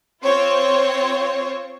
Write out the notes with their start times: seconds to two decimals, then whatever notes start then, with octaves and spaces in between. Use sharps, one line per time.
0.24 C4 F4 C5 C#5